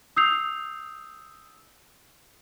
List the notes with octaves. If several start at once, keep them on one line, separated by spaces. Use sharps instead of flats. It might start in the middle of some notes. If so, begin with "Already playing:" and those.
D#6 E6 G6 C7 F7